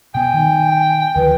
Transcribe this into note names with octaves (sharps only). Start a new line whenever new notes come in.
B2 B3 G5 G#5
D#3
D2 D#3 F3 B4